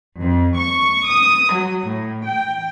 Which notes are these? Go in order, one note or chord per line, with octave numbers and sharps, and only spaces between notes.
F2
C#6
D#6
F#3
A2
G5